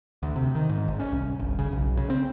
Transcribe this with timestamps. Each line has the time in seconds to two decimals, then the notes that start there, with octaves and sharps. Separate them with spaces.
0.23 D2
0.36 C3
0.55 D#3
0.69 G#2
0.88 G#1
1.00 C#4
1.12 C2
1.39 G1
1.59 C#3
1.72 B1
1.97 C#3
2.10 C4